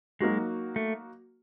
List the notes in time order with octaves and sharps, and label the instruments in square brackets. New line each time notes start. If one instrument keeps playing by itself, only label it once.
[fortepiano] F#3 A#3 D#4 F#4 [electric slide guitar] G#3
[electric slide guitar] A3